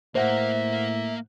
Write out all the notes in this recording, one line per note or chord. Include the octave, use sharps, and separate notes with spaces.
A2 A#3 C5 E5 F#5